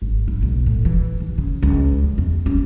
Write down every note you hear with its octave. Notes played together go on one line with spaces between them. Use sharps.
G#1
E4
B1
A2
E3
D#2
C#3
C#2
D3
E2
C#4